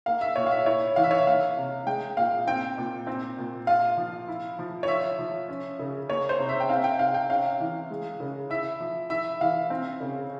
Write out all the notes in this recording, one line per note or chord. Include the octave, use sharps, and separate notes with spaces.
A#3 F5
E5
A#2 C#5
F5
E5
E4 C#5
E3 F5
E5
C#5
E5
A#3 F5
C3
G#3 G5
A#2 F5
C4 G5
A#2
C4
A#2
F4 F5
F3
E4
F3
C#5
F4 E5
F3
C#4
C#3
A#3 C#5
C5
C3
E5
G5
C4 F5
G5
C3 F5
G5
C#4 F5
E3
G#3
C#3
E4 E5
F3
E4 E5
E3 F5
C4
C#3